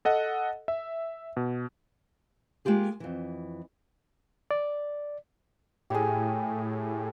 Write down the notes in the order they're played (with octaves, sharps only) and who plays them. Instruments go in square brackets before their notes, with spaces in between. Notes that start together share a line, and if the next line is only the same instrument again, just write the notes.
[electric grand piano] A4 D#5 F#5
E5
B2
[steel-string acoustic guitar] G#3 A#3 F4 G4 G#4
F2 E3
[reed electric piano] D5
[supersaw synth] A2 [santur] G4 G#4